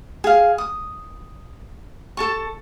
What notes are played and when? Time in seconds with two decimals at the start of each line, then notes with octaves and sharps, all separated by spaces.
0.24 G#4 F5
0.58 D#6
2.17 A4 A5 C#6